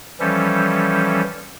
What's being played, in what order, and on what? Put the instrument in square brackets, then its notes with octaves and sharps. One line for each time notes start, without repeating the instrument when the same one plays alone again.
[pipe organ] E3 F3 G3 C#4 A4